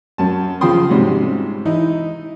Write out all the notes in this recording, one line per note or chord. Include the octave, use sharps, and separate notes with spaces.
F#2 A5
C#3 F3 F4 G5 C6 D#6
G#2 C3 G3 C#4 F#4
E3 D#4 E4